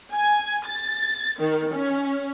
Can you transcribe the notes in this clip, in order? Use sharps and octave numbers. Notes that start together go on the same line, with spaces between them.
G#5
A6
D#3
C#4